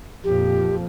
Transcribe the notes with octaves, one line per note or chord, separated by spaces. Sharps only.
F2 A#2 F3 G4